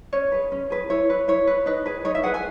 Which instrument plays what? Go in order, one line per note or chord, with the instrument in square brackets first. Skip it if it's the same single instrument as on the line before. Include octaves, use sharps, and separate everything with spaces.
[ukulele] C#4 C#5
G#4 B4
C#4
G#4 B4
E4 C#5
B4
E4 C#5
B4
D#4 B4
G#4 B4
D#4 C#5
E5
G#4 B4 F#5
G#5